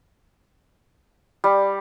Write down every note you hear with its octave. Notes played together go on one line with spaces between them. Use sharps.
G3